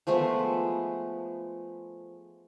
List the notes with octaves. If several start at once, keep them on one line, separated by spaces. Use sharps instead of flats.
F3 G#3 A3 B3